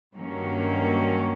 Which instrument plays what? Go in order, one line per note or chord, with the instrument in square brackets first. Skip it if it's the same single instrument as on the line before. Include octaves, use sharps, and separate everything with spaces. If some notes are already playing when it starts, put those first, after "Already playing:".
[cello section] G2 D#3 F#3 A#3 C#4